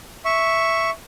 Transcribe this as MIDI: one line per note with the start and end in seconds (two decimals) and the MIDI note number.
0.25 0.90 76
0.25 0.90 85